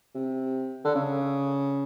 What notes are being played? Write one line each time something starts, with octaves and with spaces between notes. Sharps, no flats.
C3
D3
C#3